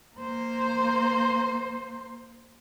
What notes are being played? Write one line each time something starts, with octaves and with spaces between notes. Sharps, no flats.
A#3 C5